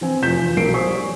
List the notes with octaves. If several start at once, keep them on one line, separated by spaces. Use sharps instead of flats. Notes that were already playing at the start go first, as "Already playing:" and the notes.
E3 C4 G#5
F1 F4 G6 B6 E7
E3 F4
B1 G#3 A#3 A#4 C7 D7
C5 C#5 G#5 C#6 D#6 B6
G3